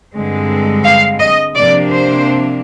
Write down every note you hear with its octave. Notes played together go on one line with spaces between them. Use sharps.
G2 D3 G#3 C4
F5
D#5
C3 F3 A#3 D4 D5
C5